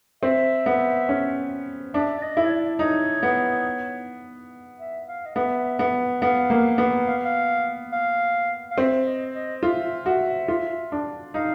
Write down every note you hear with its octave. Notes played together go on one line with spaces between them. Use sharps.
C4 E5
B3
C#4
D4 E5
D5
D#5
E4
C#5
D5
D#4 C#5
B3
E5
F5
D#5
B3 E5
B3
B3 F5
A#3
B3
F5
F5
F5
F5
C4 E5
D#5
D#5
F4 E5
F#4 E5
F4
D4
D#4 F5